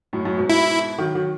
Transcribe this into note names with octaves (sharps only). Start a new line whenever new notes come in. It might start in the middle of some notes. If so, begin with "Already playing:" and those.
F#2 A2
F#2 A2
G#2 B2
E4
D#3 F#3
D#3 F#3